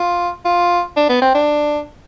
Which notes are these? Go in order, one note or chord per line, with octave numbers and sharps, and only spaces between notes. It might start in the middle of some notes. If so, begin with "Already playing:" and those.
Already playing: F4
F4
D4
B3
C4
D4